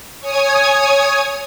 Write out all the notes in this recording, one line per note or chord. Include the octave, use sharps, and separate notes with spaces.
C#5 G#5 D#6 G#6